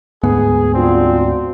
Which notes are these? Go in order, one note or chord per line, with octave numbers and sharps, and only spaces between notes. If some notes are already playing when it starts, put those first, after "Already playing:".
D2 G#2 B3 G#4
C4 D4 F4 F#4